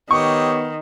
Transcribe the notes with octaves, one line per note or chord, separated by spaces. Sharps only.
D#3 B3 G4 C#5 D#5 C#6